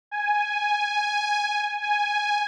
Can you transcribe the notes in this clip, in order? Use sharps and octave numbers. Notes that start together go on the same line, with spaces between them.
G#5
G#5